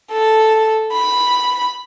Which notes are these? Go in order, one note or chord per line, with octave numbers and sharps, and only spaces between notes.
A4
B5